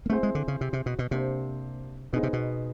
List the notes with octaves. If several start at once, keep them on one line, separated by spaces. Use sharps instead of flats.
A#3
A3 C4 E4 G#4 C5 E5
G#3
D3
C#3
C3
C3
B2
B2
C3 A#3 D4 G4 C5
B2 B3 D#4 G#4 C5 D#5
C3
B2